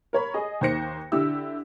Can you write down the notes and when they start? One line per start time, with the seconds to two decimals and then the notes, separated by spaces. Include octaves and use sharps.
0.13 A#4 C#5 B5
0.34 G#4 D#5
0.61 D#2 D#3 C5 A#6 C#7
1.12 D3 E4 G4 E6